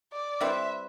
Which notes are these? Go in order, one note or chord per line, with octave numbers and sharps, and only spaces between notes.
D5
G3 C4 E4 B4 E5